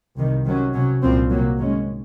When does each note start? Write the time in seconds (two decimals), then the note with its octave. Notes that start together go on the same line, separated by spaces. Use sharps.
0.17 C2 C3 D#3
0.45 C3 D#3 F#3 C#4
0.74 C3 F#3 C#4
1.02 C2 A#2 F3 C4
1.30 C3 F#3 A#3
1.58 G#2 D#3 G#3 C#4